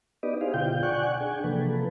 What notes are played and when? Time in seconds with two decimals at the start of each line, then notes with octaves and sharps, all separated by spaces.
0.23 B3 D#4 G4 B4 D5 D#5
0.41 E4 G#4 C5 F5
0.54 B2 D3 F4 G5 G6
0.83 D5 F#5 G#5 C#6 F#6
1.21 D4 G#4 G5 G#5
1.44 C3 E3 F3 A#3 A4 B4